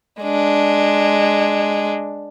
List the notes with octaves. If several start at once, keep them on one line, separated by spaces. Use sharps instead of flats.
G#3 D4